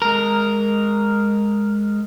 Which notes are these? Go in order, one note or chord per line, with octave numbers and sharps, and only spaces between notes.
G#3 A#4